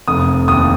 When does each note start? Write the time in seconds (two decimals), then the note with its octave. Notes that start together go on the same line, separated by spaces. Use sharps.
0.08 F1 D#6
0.48 D#2 D#6